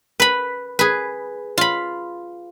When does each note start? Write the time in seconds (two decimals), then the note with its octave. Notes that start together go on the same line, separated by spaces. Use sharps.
0.20 B4 B5
0.79 G#4 B4
1.58 F4 B5